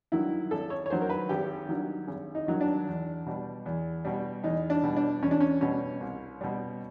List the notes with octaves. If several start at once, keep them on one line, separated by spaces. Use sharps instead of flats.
G2 D#3 F#3 E4
G#1 A4
C#5
C#5
G2 D#3 F#3 C5
A#4
B4
G#1 G4
G2 D#3 F#3
G#1
D#4
G2 D#3 F#3
D4
E2
B2 G3
E2
B2 G3
E2 D#4
D4
B2 G3
D4
E2 C#4
D4
C#4
B2 G3 C#4
C2
B2 G3